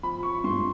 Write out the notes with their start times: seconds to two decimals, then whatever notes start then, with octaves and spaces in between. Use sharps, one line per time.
0.03 F3 B5
0.23 C#6
0.44 G2 C6